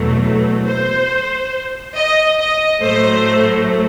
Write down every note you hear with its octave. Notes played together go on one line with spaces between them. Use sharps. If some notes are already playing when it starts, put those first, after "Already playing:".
Already playing: E2 B2 F#3 A3
C5
D#5
D#5
A2 F#3 A3 C5